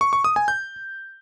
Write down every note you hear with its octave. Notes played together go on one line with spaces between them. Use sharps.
C#6
C#6
D#6
G#5
G6